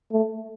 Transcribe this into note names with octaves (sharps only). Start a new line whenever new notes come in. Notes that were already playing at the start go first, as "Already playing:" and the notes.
A3